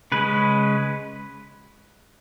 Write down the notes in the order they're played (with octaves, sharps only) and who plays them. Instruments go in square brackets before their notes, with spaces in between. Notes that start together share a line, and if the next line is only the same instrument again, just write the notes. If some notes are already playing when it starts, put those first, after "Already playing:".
[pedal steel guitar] C#3 G#3 C#4 B4